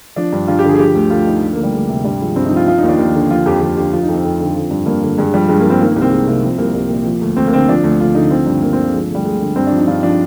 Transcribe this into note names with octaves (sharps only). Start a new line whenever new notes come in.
F3 D4
G2
G2 F4
G4
D3 G#4
G#4
F3 G4
D2
D2 F4
D3 D#4
F3
D2 A#3
G3
D2 G#3
C3
G2 G3
F3 G#3
G2 C4
D#4
F3
F4
F3 F4
D#2 D#4
D4
D#2
D3
F3 F4
F2 G4
F2 G4
D3 G4
F3 F4
D#4
F2
C4
F2
D3
F3
G2
G2 A#3
D3
G2 G#3
F3 G3
G2 G#3
F3 A#3
C4
D#3 A#3
C2 A#3
C4
C2 G#3
C3 A#3
F3 C4
C2 A#3
C2
A#2
F3
D2
D2 C4
A#3
D3 C4
F3 D4
D2
D2 F4
D3 D#4
F3 C4
G2
G2 A#3
C4
D3
A#3
F3 G#3
G#3
D2 G3
D2 G#3
D3
G2 C4
F3 D4
D#4
G2 F4
F3 D4